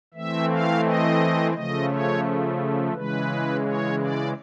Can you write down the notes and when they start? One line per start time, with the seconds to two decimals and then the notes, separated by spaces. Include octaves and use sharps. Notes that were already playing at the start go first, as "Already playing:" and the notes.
0.14 E3 A3 C4 E5
0.50 F5
0.84 D#5
1.54 C#3 F3 A3 D#5
1.89 C#5
2.94 C#3 E3 G#3 B4
3.64 C#5
3.99 D5